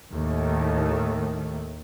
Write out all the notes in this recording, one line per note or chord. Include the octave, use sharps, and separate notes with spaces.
D#2 A2 D#3 A3